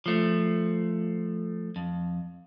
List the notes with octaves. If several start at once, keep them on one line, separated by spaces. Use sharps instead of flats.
F3 A3
F2